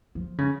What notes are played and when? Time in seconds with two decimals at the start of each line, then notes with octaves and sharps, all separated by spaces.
0.15 F3
0.38 C#3